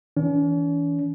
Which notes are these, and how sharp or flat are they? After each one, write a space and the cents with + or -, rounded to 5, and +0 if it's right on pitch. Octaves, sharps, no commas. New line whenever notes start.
E3 -20 C#4 +45